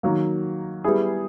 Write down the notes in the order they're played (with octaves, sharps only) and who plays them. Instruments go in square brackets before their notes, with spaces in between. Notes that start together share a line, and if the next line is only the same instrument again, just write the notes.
[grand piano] D#3 F#3 A#3
G3 B3 E4 G#4